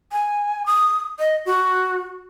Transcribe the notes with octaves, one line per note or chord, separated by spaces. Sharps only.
G#5
D#6
D#5
F#4